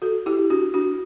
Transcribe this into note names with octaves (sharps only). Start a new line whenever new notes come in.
F#4 A4
E4 G4
D4 F#4
D4 F#4